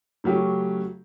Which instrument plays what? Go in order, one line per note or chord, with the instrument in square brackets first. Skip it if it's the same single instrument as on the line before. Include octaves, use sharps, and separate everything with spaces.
[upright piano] C#3 F#3 A3 C#4 G4